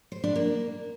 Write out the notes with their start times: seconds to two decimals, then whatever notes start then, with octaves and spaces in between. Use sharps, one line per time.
0.12 C5
0.24 D4
0.36 A#3